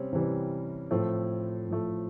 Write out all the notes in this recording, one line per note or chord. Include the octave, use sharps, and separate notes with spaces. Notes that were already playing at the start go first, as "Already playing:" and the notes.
Already playing: C3 G3 C4 C#4
C3 E3 G3
A2 F3 A3 C4
A2 F3 A3